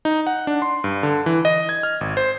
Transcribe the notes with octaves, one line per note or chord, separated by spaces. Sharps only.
D#4
F#5
D4
C6
G2
D3
E3
D#5
G#6
F6
G#1
C5